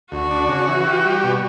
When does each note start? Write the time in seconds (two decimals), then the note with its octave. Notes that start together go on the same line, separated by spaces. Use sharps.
0.12 D2 F#4
0.30 D4
0.48 C#3
0.68 E3
0.87 G4
1.05 G3
1.24 B2